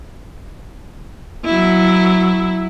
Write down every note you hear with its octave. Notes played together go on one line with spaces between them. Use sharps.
F#3 E4